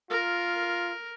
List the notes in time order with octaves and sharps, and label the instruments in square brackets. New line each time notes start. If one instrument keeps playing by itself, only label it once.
[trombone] F4 [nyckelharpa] A#4